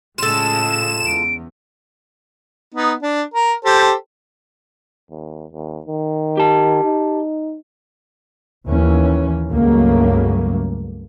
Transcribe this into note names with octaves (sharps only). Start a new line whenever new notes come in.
A2 C#3 G#3 F4 A4 E7
E2 D7
B3 D#4
D4
A#4
G4 A4 C5
D#2
D#2
D#3
G4 A5
D#4
D#2 E3 C#4
C#2 G2 C#3 F#3 A3 A#3